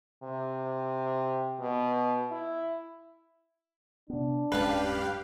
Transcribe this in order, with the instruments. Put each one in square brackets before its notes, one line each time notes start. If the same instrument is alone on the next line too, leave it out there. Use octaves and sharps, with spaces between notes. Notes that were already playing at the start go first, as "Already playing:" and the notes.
[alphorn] C3
B2
E4
[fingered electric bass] C3 B3 [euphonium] D4
[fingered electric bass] D1 G#3 C#4 [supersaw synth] G2 G4 F5 [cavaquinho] B4 A5